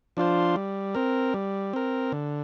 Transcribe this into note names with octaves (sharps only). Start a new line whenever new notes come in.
F3 D4 F4 C5
G3
C4 A#4
G3
C4 A#4
D3